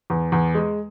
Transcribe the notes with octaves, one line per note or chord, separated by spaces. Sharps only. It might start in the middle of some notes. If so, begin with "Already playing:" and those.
E2
E2
G#3